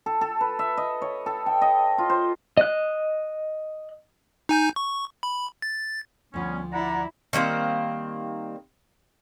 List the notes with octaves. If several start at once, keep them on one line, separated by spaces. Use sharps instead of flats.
A4
A4
B4
E5
D#5
C#5
A4
G5
D#5
F4
C5
D#5 F#6
D#4 G#5 G6
C#6
B5
A6
D2 F3 G3 B3 C#4
E4 D5 F#5 A#5
D#3 G3 A#3 C4